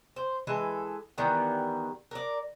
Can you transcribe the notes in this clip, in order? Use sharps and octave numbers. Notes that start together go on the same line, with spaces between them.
C5
E3 G#3 A4
D#3 E3 G3 B3
A#4 D5